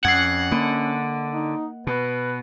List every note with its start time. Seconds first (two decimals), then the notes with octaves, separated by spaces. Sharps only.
0.05 F2 C#4 F#5 G#6 C7
0.51 D3 A#3
1.33 D#4
1.87 B2 B4